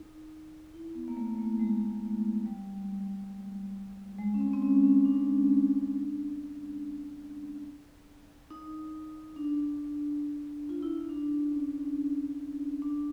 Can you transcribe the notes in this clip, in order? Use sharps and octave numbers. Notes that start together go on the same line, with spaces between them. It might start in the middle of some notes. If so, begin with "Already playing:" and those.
Already playing: D#4
E4
B3
A#3
A3
A3
G#3
G3
G#3
C#4
C4
C4
C#4
C#4
D4
D#4
D4
F4
E4
D#4
D4
C#4
D4